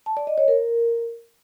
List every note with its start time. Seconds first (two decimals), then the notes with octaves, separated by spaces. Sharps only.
0.06 A5
0.17 D5
0.27 D#5
0.38 C#5
0.48 A#4